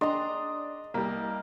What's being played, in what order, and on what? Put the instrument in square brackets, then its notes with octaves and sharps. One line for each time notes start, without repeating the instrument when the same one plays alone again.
[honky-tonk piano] D4 C6 [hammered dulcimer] D#5 A#5
[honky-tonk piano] C2 [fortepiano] G3 A#3